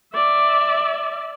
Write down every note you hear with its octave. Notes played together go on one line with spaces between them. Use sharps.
D5 E5